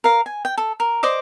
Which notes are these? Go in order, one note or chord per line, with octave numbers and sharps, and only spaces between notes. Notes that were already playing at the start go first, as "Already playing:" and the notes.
A#4 F5
G#5
G5
A4
A#4
C5 D5 D#5 D6